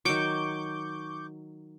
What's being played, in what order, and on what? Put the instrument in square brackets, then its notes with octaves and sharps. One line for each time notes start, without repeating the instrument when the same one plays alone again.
[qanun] D#3 F#3 [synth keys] C#6 D6 G6